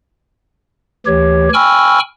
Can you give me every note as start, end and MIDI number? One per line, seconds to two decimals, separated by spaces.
1.06 1.49 38
1.06 1.49 52
1.06 1.49 67
1.06 1.49 73
1.53 1.99 79
1.53 1.99 80
1.53 1.99 83
1.53 1.99 85
1.53 1.99 88
1.53 1.99 89